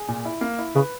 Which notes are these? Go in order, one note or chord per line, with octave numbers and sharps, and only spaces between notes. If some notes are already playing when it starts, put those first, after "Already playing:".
Already playing: G#4
A#2
E4
A#3
E4
C#3 B4